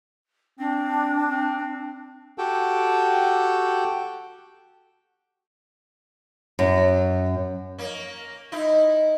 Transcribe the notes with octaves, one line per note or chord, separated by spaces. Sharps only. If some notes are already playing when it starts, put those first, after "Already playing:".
C4 D4
C4
F#4 G4 A4 G5
F#2
A#3 C#4
D#4 E4